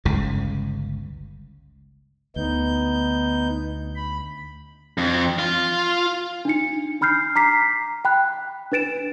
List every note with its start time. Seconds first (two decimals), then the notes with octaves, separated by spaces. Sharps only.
0.05 G1 C#2 C#3
2.36 D2 B3 D#4 G6
3.96 B5
4.98 F2
5.39 F4
6.45 D4 D#4 C#7
7.01 D4 B5 F6 G6 C7
7.36 A#5 D6 B6 C7
8.05 G5 B5 F#6
8.72 D4 B4 A6 D7 E7